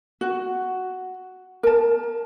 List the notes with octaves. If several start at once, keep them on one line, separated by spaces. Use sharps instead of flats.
F#4
A#4 A5